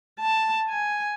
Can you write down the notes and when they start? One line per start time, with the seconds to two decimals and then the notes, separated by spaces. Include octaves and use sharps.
0.20 A5
0.69 G#5